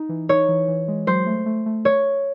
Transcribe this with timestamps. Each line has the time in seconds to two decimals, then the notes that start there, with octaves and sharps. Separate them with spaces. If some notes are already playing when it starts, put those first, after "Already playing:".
Already playing: D#4
0.09 E3
0.29 D#4 C#5
0.49 E3
0.68 E3
0.88 G#3
1.07 F#3 C5
1.27 A3
1.46 A3
1.66 A3
1.85 C#5